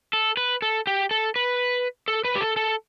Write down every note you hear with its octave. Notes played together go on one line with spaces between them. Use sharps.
A4
B4
A4
G4
A4
B4
A4
B4
G4
A4
A4